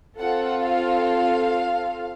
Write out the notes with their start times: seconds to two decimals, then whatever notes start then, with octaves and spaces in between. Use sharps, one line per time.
0.18 C4 F4 A4 F#5
0.63 F5